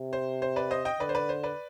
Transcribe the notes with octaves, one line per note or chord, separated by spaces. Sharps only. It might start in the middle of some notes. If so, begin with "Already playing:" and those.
Already playing: C3
C5
C5
B4 D5
C5 D#5
D#5 G5
D3 B4 D5
C5
B4 D5
C5
B4 D5